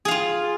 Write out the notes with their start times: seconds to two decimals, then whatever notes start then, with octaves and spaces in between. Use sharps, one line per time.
0.05 G#4
0.08 F5
0.11 F4